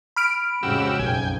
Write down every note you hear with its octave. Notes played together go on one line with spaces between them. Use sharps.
B5 F6 D7
F2 G#2 C#3 F#4 G4 E6
F#1 B1 F2 G5 G#5